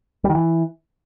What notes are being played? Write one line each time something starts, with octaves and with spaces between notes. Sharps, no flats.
G3
D#3
E3